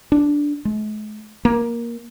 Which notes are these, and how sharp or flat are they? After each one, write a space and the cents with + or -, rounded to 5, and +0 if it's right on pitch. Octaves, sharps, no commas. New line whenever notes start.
D4 -5
G#3 +45
A#3 +10